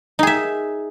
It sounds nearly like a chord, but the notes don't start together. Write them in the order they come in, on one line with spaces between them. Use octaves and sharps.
D#4 G#4 E5